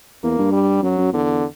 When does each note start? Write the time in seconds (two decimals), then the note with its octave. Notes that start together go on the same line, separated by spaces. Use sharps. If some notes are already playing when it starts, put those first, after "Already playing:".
0.23 E2 A#3
0.39 G2
0.53 G3
0.83 F#2 F#3
0.98 F#2
1.13 E2 D3